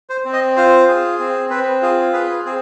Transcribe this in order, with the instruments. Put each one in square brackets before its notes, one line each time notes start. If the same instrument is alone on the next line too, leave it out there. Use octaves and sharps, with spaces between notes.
[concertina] C5
C4
D#5
F4 C5
G#4
C4
C4 B4
F4 G#4
G#4 B4
C4 G#4